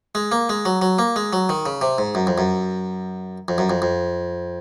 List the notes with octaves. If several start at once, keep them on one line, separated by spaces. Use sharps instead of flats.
G#3
A#3
G#3
F#3
F#3
A#3
G#3
F#3
D#3
C#3
C3
G#2
F#2
F2
F#2
F2
F#2
F2
F2